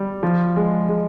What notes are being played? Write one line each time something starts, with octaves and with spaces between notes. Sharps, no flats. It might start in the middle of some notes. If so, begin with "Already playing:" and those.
Already playing: G3
F3
G#3
G#3